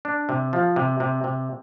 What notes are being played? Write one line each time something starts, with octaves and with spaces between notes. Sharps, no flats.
D4
C3
F3
C3
C3
C3